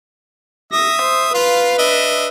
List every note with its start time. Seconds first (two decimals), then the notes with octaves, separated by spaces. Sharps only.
0.73 E5 D#6 A#6
1.02 C5
1.34 F4 B4 F5
1.78 D4 D#5 E5